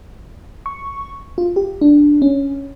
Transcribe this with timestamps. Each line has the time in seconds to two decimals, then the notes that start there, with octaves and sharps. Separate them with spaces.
0.66 C#6
1.38 F4
1.56 G4
1.81 D4
2.22 C#4